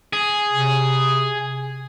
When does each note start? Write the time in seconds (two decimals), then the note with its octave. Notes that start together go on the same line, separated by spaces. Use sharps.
0.13 G#4
0.51 C3